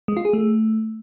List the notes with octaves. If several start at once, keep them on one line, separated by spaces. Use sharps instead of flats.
G#3
F4
G#4
A3